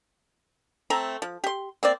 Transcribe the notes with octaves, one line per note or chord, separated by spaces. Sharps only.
A3 C4 A#5
F3
G4 C6
A#3 C4 D5